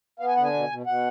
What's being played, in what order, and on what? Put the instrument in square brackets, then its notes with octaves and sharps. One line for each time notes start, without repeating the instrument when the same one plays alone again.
[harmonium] B3 F5
G#5
D3 F#5
G#5
B2
B2
B2 F#5